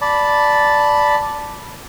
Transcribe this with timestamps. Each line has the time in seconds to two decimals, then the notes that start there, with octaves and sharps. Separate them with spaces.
0.02 D5 A5 B5